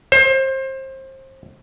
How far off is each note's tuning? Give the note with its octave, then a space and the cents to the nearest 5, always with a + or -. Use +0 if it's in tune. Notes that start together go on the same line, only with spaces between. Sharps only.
C5 +30